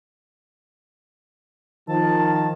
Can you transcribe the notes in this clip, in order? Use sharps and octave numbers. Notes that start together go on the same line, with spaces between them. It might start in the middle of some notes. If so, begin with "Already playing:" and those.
D#3 F3 A5